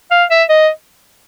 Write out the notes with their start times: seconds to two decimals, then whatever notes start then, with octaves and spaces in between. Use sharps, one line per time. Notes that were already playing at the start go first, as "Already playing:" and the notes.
0.11 F5
0.30 E5
0.49 D#5